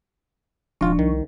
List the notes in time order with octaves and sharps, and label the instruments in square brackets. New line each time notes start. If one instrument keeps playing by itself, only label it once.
[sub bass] D#1 [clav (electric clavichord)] G#1 F4 [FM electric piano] F3 D4 C#6
[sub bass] C2 [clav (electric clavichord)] D#3